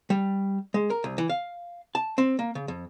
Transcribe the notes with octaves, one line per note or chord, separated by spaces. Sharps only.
G3
G#3
A#4
C2
E3
F5
A5
C4
A#3
C#3
F2